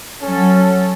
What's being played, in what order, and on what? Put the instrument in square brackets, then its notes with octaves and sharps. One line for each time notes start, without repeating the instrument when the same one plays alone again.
[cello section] F#3 A4 [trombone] C#4